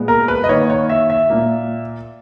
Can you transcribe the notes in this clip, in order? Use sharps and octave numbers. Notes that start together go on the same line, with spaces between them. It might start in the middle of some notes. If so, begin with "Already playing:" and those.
Already playing: A#2 G#3 B3
A#4
B4
D#5
D#3 A#3 C#5
C#5
E5
E5
A#2 A#3